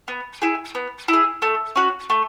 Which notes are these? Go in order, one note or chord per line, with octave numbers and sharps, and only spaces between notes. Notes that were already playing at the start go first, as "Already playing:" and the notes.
B3
E4 G#4
B3
E4 G#4
A3
C#4 F#4
A3